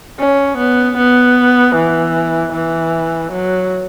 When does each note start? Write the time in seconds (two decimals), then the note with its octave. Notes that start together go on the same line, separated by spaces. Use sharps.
0.19 C#4
0.58 B3
0.97 B3
1.76 E3
2.53 E3
3.31 F#3